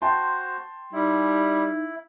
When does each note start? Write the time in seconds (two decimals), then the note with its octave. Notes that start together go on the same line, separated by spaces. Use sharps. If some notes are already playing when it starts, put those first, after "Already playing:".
0.02 F#4 C5 G5 A5 C6
0.93 G3 D#4 E4